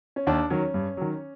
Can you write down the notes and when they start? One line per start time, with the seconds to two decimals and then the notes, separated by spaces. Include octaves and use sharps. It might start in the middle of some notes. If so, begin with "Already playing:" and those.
0.16 C#4
0.27 D#2 D4
0.50 D#3 F#3 C#4
0.74 G2
0.97 D#3 F#3